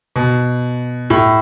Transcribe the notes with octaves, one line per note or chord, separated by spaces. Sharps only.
B2
A2